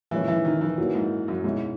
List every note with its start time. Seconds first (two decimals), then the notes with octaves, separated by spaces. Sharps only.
0.11 A#2 E3 G#3 C#4 E4
0.28 E3
0.45 D#3
0.61 E3
0.78 E3 F#3 A#3 C#4
0.95 G#2
1.28 F#2
1.44 G#2 B2 G#3 C#4 E4